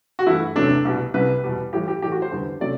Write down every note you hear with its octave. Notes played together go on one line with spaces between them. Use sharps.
F#4
G2 E3 A3 E4
E2 C3 F#3 A3 D4
C2 B2 G3
C2 C3 G3 B4
E2 B2 G3
A2 E3 G3 G4
G4
A2 E3 A3 G4
F#4
C5
E2 D3 G3
C3 F#3 A3 D5